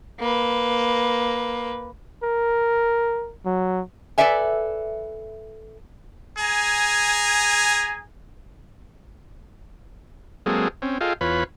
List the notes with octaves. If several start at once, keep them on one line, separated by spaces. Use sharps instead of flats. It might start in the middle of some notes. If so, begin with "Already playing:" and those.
A#3 B4
A#4
F#3
A4 B4 D5 E5 G#5
G#4 G#5 A#5
F#3 G#3 A#3 C4 G#4 A4
C4 C#4
F4 G#4 A4 D#5 F5 G5
E2 F4 B4 C#5 B5